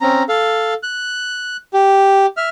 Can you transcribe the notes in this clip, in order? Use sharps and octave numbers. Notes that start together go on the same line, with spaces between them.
C4 C#4 A#5
A4 F5
F#6
G4
E5 F6